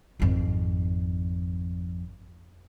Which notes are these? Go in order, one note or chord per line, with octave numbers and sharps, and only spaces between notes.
G#1 F2